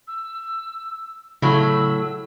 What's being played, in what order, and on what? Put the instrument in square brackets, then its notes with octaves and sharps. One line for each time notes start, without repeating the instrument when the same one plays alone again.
[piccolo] E6
[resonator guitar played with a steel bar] A2 F#3 [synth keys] C#3 [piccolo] E6